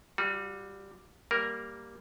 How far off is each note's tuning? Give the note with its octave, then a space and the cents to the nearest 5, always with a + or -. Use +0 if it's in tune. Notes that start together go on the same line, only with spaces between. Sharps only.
G3 +0 F#4 -40
G3 +0 A#3 -5 A#4 +0